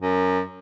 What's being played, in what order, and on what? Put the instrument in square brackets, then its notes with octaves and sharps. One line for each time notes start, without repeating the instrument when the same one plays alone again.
[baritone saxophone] F#2